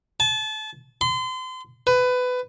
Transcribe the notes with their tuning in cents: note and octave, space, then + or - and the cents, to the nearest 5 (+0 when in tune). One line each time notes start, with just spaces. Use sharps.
A5 -30
C6 -35
B4 +20